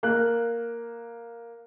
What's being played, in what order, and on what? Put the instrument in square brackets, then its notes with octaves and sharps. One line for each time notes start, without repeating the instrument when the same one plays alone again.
[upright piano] A#3 F#6